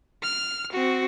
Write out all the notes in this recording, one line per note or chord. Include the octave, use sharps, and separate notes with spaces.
F6
C4 F#4